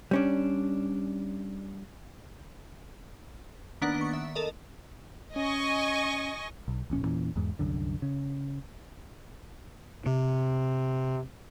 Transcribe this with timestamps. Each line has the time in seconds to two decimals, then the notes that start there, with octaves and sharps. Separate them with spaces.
0.11 G3 C#4 D4
3.82 D#3 A#3 B3 D4 F#5
4.01 C#6
4.13 E5
4.35 A4 A#4 D#5
5.36 C#4 D#5 G#5 C#6
6.68 B1
6.90 D1 A#1 C#4
7.03 E2 A#2 E3 C#4
7.36 E2 G#2
7.59 C2 F#2 D3
8.02 C#3
10.06 C3